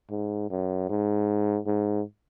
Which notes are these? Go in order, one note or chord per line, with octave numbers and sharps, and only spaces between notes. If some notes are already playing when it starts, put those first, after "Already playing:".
G#2
F#2
G#2
G#2